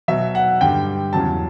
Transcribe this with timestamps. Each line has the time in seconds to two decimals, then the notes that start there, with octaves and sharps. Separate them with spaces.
0.08 B2 F#3 E5
0.35 F#5
0.61 G2 D3 G3 G5
1.13 E2 C#3 F#3 A5